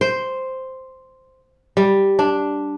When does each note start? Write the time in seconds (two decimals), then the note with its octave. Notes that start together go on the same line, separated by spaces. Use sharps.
0.01 C5
1.77 G3
2.19 D4